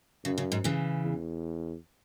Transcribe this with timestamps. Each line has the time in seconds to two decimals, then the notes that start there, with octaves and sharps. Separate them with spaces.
0.24 F#2 C#3
0.38 C#3
0.52 G#2
0.64 C#3 E3
1.04 E2